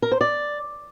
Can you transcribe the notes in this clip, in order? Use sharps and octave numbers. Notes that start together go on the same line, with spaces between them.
A#4
C5
D5